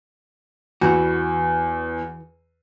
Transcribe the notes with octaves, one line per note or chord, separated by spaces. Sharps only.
E2 E3 F#4